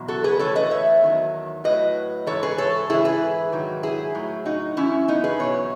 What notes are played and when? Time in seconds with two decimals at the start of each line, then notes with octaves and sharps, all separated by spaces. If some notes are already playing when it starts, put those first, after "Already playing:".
Already playing: E2 B2 F#3
0.08 F#4 A4
0.24 G#4 B4
0.39 A2 E3 A4 C#5
0.55 B4 D#5
0.71 C#5 E5
1.02 E2 D#3 F#3
1.64 A2 F#3 B4 D#5
2.26 G#2 E3 A4 C#5
2.43 G#4 B4
2.58 A4 C#5
2.89 G#2 E3 E4 G#4
3.05 G#4 B4
3.52 G#2 D#3 F#3
3.83 E4 G#4
4.15 A2 F#3
4.45 D#4 F#4
4.77 F#2 E3 C#4 E4
5.08 B3 D#4
5.24 G#4 B4
5.39 E2 B2 F#3 C#5